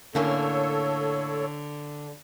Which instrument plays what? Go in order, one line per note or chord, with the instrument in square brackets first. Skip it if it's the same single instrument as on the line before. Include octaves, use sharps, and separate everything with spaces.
[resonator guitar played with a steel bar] A2 A#3 C#4 [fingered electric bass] D3 [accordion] A4 C#5